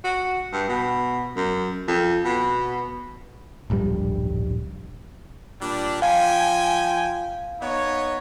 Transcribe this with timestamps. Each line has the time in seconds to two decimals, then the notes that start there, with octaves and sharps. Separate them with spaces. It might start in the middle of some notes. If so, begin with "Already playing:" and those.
0.04 F#4
0.52 G2
0.68 B2
1.36 F#2
1.88 F2
2.25 B2
3.70 D1 A#1 G2 G3
5.61 A#2 G3 D4
6.02 F3 F5 G5 G#5
7.61 B3 D#4 C#5